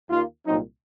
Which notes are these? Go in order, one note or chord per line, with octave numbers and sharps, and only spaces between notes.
D#2 D#3 A#3 F4
C2 A#2 F#3 C4 D#4